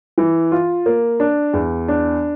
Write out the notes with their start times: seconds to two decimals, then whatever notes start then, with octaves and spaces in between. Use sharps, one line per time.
0.18 E3
0.52 F4
0.86 A#3
1.20 D4
1.53 E2
1.88 D4